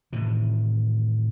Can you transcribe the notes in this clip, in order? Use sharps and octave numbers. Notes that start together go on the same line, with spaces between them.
A2 C3 D#3 E3